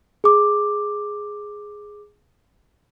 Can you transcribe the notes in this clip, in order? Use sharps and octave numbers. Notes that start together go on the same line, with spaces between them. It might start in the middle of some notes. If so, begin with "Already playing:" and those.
G#4 D6